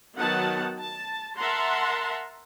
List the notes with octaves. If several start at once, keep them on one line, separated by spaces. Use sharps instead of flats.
D#3 F#3 B3 F#5 A5
A5
A#4 E5 F#5 A5 A#5 C6